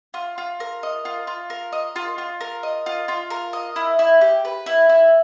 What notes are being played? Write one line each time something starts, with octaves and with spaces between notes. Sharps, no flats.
F4
F4
A#4
D#5
F4
F4
A#4
D#5
F4
F4
A#4
D#5
F4
F4
A#4
D#5
E4
E4
G4
B4
E4
E4